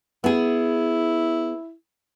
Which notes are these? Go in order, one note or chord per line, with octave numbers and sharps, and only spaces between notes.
B3 E4 G#4